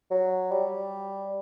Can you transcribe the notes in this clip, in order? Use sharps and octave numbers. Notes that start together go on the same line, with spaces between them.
F#3
G3